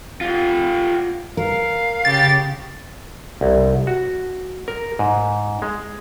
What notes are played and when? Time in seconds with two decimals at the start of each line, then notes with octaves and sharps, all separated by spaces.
0.21 F4 G4
1.37 A#4 F5
2.05 C#3 G4 A6
3.41 C2
3.87 F#4
4.68 A#4
4.99 G#2
5.62 G#3